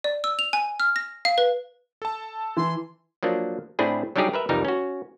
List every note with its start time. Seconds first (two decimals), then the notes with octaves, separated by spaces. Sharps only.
0.04 D5
0.24 E6
0.39 F7
0.53 G#5
0.80 F6
0.96 A#6
1.25 F5
1.38 B4
2.02 A4 A5
2.57 E3 C6
3.23 F3 F#3 A#3 D4
3.79 A2 C4 D4 E4 G#4
4.16 F#3 G3 D4 D#4 G4 G#4
4.33 A#4 B4 E5
4.49 C2 F2 E3 G3 D#4 A#4
4.65 C#4 F#4